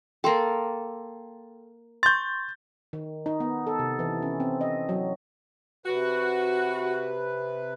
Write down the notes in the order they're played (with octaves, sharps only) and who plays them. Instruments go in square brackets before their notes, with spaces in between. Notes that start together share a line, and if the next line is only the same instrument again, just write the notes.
[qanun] A#3 A4 [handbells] G5 C6
[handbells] C6 C#6 [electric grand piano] G6 A6
[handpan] D#3
D#4
B3
A4
C3
E3
C#4
C4
D#5
F#3
[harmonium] C3 B4 [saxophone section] F#4